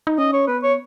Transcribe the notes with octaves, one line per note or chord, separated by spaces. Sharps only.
D#4
C#4 D#5
C#5
B3 B4
C#5